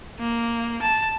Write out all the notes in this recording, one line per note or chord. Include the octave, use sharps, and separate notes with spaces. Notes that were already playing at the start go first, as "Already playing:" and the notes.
A#3
A5